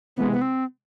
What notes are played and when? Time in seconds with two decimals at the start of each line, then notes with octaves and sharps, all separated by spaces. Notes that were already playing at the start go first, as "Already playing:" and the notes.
0.17 C3 E3 G#3 B3
0.32 B3
0.41 C4